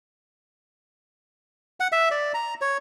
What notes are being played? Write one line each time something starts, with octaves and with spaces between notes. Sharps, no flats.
F#5
E5
D5
A#5
C#5